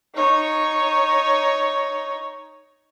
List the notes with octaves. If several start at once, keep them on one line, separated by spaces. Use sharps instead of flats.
D#4 C#5